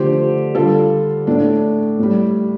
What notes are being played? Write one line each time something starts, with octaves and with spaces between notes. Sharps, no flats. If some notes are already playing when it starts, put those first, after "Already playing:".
Already playing: D3 F3 A3 G4 C5
D3 G3 F4 A4
A2 A3 D4
A2 G3